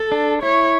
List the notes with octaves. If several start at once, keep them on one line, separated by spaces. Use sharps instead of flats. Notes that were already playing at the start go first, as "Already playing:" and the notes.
Already playing: A4
D4
E4 C#5